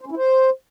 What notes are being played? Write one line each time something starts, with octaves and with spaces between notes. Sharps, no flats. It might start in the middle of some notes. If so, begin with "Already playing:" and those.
C5
C#4
E4
C5